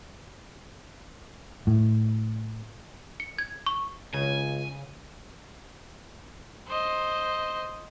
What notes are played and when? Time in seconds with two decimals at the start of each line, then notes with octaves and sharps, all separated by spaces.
1.67 A2
3.20 C#7
3.38 G#6
3.66 C#6
4.14 C#2 C#3 G#5
6.68 C5 D#5